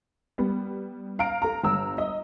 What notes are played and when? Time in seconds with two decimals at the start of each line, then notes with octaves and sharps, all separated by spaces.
0.38 G3 B3
1.19 F5 A#5 F6 D7
1.42 A4 A#5
1.63 G1 A#5 E6
1.98 D#5